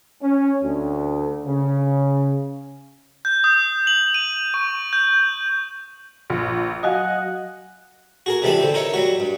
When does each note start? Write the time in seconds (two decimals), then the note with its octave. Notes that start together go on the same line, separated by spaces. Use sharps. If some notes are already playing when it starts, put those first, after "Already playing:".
0.22 C#4
0.63 D2
1.46 C#3
3.25 G6
3.44 D#6
3.87 F#7
4.14 D#7
4.54 C#6
4.93 G6
6.30 A#1
6.83 F#3 F#4 D#5 F5 F#5 G#5
8.26 F#4 G#4 A#4
8.42 F2 C3 E3 G3 D4 B5
8.60 D3 C4
8.74 D#4 E4 A#4 C#5
8.94 F#3 G3 F#4
9.20 G2